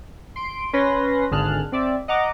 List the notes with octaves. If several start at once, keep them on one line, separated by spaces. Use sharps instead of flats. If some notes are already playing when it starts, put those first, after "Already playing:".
C6 D7
C#4 B4 C6 A#6
G#1 D3 G#4 A5 F6 F#6
C4 D5 E5
D#5 F#5 A#5 D6